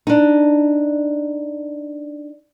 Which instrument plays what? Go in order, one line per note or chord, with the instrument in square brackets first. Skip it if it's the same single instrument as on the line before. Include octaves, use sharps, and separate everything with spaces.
[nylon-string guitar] D4 D#4